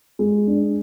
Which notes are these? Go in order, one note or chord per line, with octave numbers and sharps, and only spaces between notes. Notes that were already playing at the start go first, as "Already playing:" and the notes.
G#3
D4